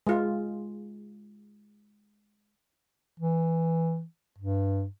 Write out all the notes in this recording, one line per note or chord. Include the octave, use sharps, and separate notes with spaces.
G#3 F4
E3
G2